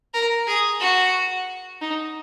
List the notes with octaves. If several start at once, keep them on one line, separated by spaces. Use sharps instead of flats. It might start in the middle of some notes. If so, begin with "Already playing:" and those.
A#4
G#4
F#4
D#4